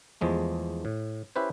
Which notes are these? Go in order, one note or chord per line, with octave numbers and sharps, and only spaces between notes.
E2 F3 G#3 A3
A2
C#4 E4 G4 B4 C5